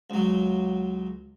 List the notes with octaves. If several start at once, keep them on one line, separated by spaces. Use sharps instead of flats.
C#2 F#3